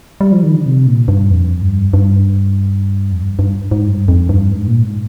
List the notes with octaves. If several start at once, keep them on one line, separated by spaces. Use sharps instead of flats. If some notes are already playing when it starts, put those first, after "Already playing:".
G3
F3
D#3
D3
C3
A#2
G2
F2
G2
G2
F2
G2
G2
G#2
G2
F2
G2
G#2
A#2
G#2